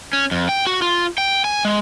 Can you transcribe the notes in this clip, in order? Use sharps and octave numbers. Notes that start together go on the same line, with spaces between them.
C#4
F2
G5
F#4
F4
G5
G#5
G#3